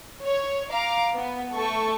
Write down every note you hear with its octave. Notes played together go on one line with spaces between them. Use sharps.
C#5
F5 A#5 D6
B3
A3 A4 C#6